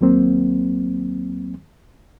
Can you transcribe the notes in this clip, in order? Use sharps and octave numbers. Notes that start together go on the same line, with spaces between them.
D#2 F#3 A#3 C4